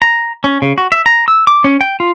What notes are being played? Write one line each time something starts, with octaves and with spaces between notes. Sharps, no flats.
A#5
C#4
C#3
F#4
E5
A#5
E6
D6
C#4
G5
F4